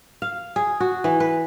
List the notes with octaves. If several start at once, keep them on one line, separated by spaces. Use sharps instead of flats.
F5
G#4
F#4
E3
B4